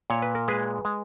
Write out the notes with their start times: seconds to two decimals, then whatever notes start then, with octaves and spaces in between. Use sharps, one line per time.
0.10 A#2 C#5
0.22 B4
0.35 A#4
0.48 G#3 G#4 B4
0.85 G#3